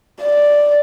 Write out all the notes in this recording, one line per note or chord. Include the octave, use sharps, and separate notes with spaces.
D5